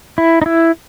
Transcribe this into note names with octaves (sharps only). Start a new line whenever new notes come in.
E4
D#4
E4